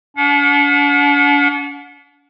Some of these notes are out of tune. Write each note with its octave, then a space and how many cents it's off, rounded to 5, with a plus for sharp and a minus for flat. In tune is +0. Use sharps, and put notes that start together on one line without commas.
D4 -45 F#5 -30